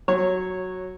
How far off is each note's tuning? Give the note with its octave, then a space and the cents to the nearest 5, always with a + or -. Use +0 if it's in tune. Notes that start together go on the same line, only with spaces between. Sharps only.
F#3 +0 C#5 -10